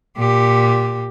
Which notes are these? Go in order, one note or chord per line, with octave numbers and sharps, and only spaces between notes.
A#2 G4